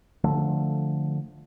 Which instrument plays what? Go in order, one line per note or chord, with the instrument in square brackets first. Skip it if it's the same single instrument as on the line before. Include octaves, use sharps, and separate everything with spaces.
[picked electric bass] D3 F3 A3